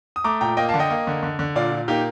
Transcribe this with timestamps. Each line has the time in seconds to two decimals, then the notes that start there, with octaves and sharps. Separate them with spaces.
0.16 D#6
0.24 A3 A#5 D6
0.41 A#2 G5 A#5
0.57 A#3 D#5 G5
0.69 F5 A5
0.74 D3
0.79 D#5 G5
0.90 A#3
1.07 D3
1.23 D3
1.39 D3
1.56 A#2 D5 F5
1.72 A#2
1.88 A#3 D#4 G4